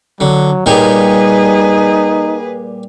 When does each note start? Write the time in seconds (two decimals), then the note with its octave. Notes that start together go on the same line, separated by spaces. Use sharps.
0.20 D3 F#3
0.66 A#2 G3 D#4 G#4 B4 C#5